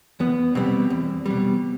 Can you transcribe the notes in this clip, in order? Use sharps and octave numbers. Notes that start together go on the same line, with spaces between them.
E2 B3
B2 G3 C4
E2
B2 G3